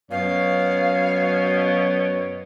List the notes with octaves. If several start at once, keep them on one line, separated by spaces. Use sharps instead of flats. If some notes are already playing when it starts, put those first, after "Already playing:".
F#2 B2 C#5 F5